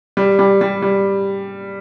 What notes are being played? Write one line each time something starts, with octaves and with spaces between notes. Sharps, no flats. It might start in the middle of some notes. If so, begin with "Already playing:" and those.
G3
G3
G3
G3